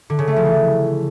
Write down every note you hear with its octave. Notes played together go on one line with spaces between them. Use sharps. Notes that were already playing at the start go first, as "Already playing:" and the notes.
D3
C#3
A3
F3
E3